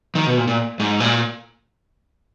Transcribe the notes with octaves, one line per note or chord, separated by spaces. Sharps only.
D#3
B2
A#2
A#2
G#2
A#2